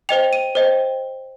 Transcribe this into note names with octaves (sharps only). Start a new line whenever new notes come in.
C5 D#5 G5 F7
D#7
C5 D#5 G5